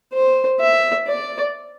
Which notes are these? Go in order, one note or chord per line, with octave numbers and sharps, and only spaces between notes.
C5
E5
D5